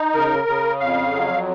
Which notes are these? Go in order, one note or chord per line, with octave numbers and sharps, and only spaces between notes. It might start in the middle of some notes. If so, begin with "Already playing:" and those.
Already playing: D#4
C#3 A#4
C#3
F2 F5
F#3